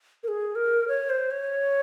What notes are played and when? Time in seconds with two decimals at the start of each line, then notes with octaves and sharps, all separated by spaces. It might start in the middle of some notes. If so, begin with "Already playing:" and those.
0.23 A#4
0.28 G#4
0.55 A#4
0.88 C#5
1.10 C5
1.31 C#5